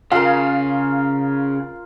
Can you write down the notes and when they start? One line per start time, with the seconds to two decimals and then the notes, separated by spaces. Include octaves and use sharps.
0.11 C#3 F4 A#4 F5